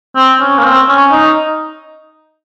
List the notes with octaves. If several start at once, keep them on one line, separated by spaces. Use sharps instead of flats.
C4
C#4
A#3
C4
C#4
D#4